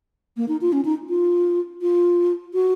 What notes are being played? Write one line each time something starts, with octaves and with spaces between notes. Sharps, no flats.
A#3
D#4
F4
C#4
D#4
F4
F4
F#4